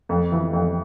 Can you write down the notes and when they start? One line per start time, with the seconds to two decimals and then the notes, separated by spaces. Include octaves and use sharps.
0.09 F2
0.32 E3
0.53 F2